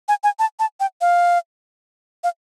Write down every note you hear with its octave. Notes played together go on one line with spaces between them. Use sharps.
G#5
G#5
A5
A5
G5
F5
F5